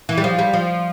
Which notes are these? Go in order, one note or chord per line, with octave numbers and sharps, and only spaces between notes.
E3
G3
F3
G3
F3